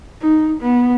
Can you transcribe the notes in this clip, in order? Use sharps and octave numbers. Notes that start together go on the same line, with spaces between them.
D#4
B3